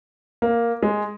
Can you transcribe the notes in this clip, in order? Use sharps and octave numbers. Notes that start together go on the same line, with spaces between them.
A#3
G#3